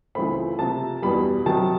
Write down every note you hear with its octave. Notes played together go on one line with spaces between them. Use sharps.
C#2 C#3 E3 A3 C4 B5
C3 F3 A#3 A5
E2 B2 G3 B5
C3 D#3 F#3 A5